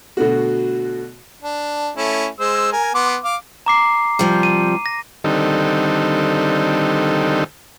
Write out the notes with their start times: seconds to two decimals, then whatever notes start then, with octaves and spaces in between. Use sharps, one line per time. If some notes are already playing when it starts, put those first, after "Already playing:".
0.17 B2 D3 A3 F#4
1.43 D4
1.97 A3 C#4 E4
2.40 G#3 C5 E6
2.72 A#4 G#5
2.94 B3 C6 D6
3.24 F5 D6
3.66 A#5 D6 C7
4.19 C3 F3 G3
4.43 D#7
4.86 A#6
5.24 D3 D#3 G3 C4 D#4 A4